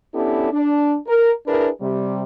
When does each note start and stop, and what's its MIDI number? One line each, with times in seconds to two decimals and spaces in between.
0.14 0.48 59
0.14 0.48 61
0.14 0.48 62
0.14 0.48 64
0.14 0.48 67
0.14 0.48 69
0.52 0.95 62
1.07 1.31 70
1.47 1.69 62
1.47 1.69 64
1.47 1.69 68
1.47 1.69 70
1.47 1.69 71
1.81 2.23 48
1.81 2.23 55